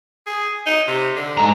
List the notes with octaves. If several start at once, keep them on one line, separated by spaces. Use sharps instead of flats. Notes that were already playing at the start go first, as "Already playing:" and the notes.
G#4
D#4
C3
D3
G#2 A#5